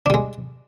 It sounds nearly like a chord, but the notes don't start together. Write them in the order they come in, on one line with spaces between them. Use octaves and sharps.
D4 G3 G#3